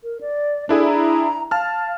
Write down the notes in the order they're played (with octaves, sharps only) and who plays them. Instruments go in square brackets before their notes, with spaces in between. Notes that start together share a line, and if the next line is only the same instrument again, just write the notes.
[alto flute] A#4
D5
[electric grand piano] D4 E4 G#4 [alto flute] A4
[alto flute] A#5
[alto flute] F5 [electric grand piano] A5 F6